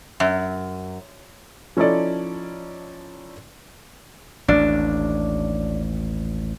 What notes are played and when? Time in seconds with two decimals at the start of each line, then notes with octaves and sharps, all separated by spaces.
0.20 F#2
1.77 F3 C#4 D#4 E4 A4 D5
4.48 A1 D#2 D4